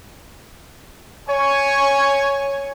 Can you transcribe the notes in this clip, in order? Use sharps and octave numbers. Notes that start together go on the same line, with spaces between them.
C#5 G#5